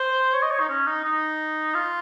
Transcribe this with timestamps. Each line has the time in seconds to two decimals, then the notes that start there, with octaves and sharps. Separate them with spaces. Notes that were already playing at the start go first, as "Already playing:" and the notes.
Already playing: C5
0.34 C#5
0.42 D#5
0.51 C#5
0.60 D#4
0.69 C#4
0.87 D#4
1.04 D#4
1.74 F4